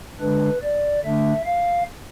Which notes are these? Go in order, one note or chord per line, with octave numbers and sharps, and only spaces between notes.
D3 G#3 D4 B4
D5
D3 A3 D4 E5
F5